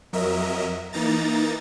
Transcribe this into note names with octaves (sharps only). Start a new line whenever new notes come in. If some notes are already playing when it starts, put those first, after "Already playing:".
F2 F#3 A#4 D#5 E5
E3 A#3 D#4 A#5 A6